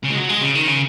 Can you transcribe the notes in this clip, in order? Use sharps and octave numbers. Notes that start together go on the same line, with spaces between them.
C#3
G#3
F#3
G#3
C#3
D#3
C#3